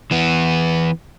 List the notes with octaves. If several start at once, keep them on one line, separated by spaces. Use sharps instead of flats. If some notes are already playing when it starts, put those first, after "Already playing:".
E3 B3